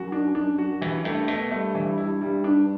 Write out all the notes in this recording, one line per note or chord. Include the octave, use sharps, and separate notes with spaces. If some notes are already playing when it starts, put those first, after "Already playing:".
Already playing: F#2 F#4
D4
D4
F#4
G2 E3
F#2
G2 A3
B2 A3
G2 A3
E3
E4
G3
D4